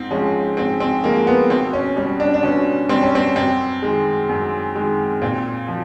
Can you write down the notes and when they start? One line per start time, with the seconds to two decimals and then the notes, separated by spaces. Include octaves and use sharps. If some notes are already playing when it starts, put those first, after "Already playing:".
Already playing: G#2 C4
0.11 F3 G#3 C#4
0.57 G#2 C4
0.80 C4
1.04 F3 G#3 A#3
1.27 B3
1.50 B2 C4
1.73 C#4
1.97 G3 C#4
2.20 D4
2.34 D4
2.43 B2 C#4
2.89 G3 C4
3.03 C#4
3.15 C4
3.36 F#2 C4
3.82 D#3 G#3
4.29 F#2
4.75 D#3 G#3
5.22 A#2 C4
5.68 F3